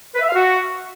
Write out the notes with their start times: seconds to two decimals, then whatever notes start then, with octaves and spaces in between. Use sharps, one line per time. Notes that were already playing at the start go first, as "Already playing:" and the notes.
0.14 B4
0.21 E5
0.28 F5
0.35 F#4